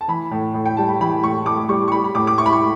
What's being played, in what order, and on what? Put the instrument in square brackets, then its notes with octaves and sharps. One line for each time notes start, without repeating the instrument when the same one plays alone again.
[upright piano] A5
E3 B5
A2
A2
G5
G3 A5
B5
E3 B5
A2 C#6
A2 D6
G3 C#6
C#6
G3 B5
B5
A2 D6
D6
E4 C#6
B5
C#6